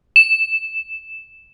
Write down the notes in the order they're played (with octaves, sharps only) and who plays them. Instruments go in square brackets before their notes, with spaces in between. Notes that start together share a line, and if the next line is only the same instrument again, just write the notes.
[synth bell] E7